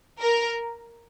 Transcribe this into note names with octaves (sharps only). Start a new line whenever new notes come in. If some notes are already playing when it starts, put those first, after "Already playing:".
A#4